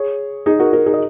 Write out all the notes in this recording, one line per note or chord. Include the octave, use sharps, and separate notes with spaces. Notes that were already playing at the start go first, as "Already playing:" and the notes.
Already playing: G#4 C#5
D#4 G#4
F#4 A#4
F#4 A#4
D#4 G#4
D#5